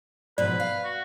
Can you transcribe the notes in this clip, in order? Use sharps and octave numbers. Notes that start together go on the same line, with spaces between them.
G#2 B2 F3 B4 D5
F5
F#4